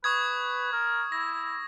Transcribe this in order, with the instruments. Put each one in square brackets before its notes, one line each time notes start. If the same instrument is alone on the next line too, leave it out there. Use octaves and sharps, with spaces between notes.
[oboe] B4 [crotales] C#6 D#6 G#6
[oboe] A#4
[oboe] E4 [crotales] A#6